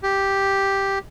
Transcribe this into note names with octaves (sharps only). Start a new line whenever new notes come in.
G4